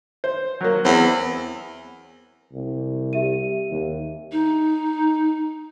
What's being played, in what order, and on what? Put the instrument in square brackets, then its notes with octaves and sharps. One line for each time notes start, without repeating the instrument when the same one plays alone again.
[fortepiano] C5
F#3 A#3
[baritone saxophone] E2 [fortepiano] C4
[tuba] C2
[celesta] G4 E5 D#7
[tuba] D#2
[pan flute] D#4